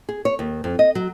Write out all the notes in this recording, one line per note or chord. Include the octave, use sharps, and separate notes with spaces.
G#4
C#5
D#2
F2
D#5
F#3